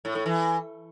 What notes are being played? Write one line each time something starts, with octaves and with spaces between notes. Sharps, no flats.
A2
A2
E3